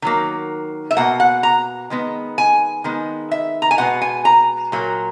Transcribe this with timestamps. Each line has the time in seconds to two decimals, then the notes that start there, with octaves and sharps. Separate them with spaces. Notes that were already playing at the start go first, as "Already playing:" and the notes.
0.02 D#3 F#3 A#3
0.91 E5
0.97 B2 A#3 F#5
1.20 F#5
1.43 A#5
1.90 D#3 G#3 B3
2.38 G#5
2.84 D#3 G#3 B3
3.31 E5
3.62 A#5
3.71 G#5
3.78 B2 G#3 B3 F#5
4.02 G#5
4.25 A#5
4.72 A#2 F#3 A#3